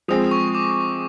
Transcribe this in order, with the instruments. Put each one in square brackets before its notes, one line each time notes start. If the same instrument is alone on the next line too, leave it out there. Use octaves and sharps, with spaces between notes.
[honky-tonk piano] F3 G#3 C4 [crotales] D#6
[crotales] C#6
D6